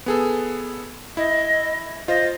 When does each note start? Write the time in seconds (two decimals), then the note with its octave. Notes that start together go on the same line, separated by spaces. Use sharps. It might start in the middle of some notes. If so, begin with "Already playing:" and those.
0.06 B3 G#4 A4
1.17 E4 D#5
2.08 F4 C5 D#5